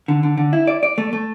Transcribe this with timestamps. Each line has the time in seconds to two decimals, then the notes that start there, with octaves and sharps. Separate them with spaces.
0.08 D3
0.23 D3
0.38 D3
0.53 E4
0.67 D5
0.83 D5
0.98 A3
1.13 A3